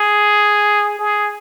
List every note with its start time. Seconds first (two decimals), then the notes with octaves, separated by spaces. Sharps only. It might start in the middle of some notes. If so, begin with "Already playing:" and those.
Already playing: G#4
0.99 G#4